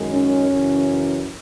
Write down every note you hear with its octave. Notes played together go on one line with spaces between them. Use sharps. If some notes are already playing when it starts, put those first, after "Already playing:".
Already playing: F#2 D#3 G#3
C#4
F#2 C#3 E3